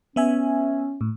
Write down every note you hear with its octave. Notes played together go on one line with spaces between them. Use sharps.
B3 C#4 E5 G#5
A2